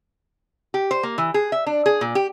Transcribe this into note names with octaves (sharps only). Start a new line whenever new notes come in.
G4
C5
A#3
E3
G#4
E5
D4
G#4
A#2
G4